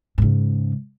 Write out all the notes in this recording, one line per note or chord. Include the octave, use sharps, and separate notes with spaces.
G#2 C#3